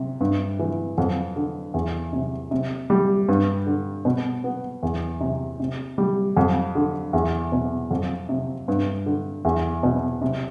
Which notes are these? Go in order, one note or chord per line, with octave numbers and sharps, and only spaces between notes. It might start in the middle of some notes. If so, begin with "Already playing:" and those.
Already playing: C3
G2
E3
F2
D3
E2
C3
C3
G3
G2
D3
B2
B3
E2
C3
C3
G3
F2
D3
E2
B2
F2
C3
G2
D3
E2
B2
C3